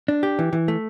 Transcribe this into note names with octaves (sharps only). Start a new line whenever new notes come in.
D4
G4
E3
E3
A3